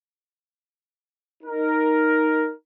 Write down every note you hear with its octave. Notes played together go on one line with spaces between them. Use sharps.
D#4 A#4